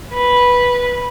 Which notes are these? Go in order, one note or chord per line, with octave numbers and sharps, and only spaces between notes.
B4